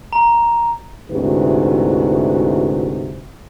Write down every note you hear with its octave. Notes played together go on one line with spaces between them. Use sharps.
A#5
D2 G#2 C3 E4 F#4 B4